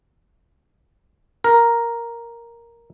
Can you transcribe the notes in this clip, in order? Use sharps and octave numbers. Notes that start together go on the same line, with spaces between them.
A#4